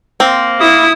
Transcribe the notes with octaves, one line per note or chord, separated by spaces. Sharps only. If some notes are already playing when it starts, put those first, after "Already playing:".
A#3 C4
E4 D#6